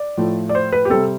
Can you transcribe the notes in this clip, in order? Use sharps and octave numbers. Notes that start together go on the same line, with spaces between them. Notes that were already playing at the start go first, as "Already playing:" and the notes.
Already playing: D5
A2 F3 A3
D5
C5
B4
G4
C3 G3 C4 A4